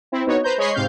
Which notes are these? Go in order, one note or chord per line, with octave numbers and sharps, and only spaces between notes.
C4 E4
B3 D#4 F#4 C#5
B4 C5 A#5 G6
G#3 C#5 D#5 B5 C#6 C7
G#2 C3 F5 G6